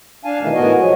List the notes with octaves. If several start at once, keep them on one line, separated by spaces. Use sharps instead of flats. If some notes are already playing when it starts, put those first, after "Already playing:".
D4 F5 G#5 A5
E2 B2 D#3 E3 A3 D#4
A2 B3 F#4 A#4 D#5 G#5
F3 F#3 G#3